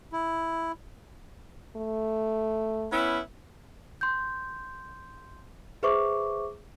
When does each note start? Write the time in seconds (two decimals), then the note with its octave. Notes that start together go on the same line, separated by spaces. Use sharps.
0.13 E4
1.76 A3
2.93 B3 C#4 E4
4.01 C6 G6
5.83 G#4 B4 C5 E5 C#6 D6